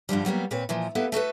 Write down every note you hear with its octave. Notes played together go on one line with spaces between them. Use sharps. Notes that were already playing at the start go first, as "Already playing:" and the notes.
G2 D3 F3 G3
F#3 G3 A#3 B3
A#2 C4 B4 C#5
A#2 E3 F3
A#3 B3 E4 G4 A4 B4
A3 F#4 A4 B4